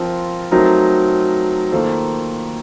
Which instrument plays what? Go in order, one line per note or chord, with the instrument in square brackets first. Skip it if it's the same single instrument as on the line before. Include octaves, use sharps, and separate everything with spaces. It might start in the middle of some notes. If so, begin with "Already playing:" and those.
Already playing: [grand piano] F3 C4 F4 A#4
F#3 A3 C4 D#4 A#4
D#3 A#3 F4 A4 C5